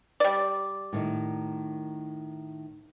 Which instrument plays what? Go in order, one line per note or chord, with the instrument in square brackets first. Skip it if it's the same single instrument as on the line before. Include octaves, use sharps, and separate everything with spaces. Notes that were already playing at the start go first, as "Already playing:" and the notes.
[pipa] G3 D5
[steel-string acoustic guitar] A2 D#3